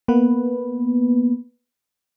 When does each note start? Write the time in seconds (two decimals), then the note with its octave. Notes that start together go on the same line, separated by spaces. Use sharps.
0.08 A#3 B3 B4